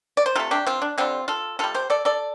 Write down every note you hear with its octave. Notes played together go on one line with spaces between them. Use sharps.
D5
C5
C3 A3 F4 A4
D4 G4
C4 F4
D4
D3 G3 C4 F4
F4 A4
C3 G3 F4 A4
G4 C5
A4 D5
A4 D5